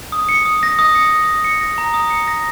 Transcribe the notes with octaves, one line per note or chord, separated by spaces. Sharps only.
D#6
C#7
D#6
A#6
D#6
C#7
D#6
A#6
C#7
A#6
A#5
D#6
C#7
A#6